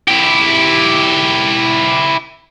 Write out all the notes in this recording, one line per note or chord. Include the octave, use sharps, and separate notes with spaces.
E4 G4